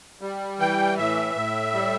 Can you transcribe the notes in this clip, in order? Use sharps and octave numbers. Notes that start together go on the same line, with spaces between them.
G3
E3 G5
A2 E5
A2
G3